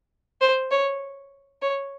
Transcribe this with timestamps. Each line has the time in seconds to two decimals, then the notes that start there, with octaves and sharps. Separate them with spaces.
0.41 C5
0.71 C#5
1.62 C#5